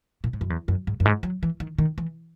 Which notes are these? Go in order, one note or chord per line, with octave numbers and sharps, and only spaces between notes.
A#2
G#2
F#2
E2
F#2
G#2
F#2
G#2
F#3
E3
D#3
D#3
E3